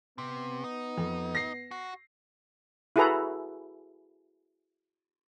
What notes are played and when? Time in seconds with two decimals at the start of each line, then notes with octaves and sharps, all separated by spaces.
0.18 C3 B3
0.64 D#4
0.98 F2
1.35 A#6 C7
1.71 F#4
2.96 E4 F#4 G#4 A4 B4 A#5